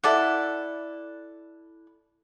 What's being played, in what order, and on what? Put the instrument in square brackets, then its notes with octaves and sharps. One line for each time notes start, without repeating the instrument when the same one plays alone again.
[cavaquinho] E4 A4 D5 F#5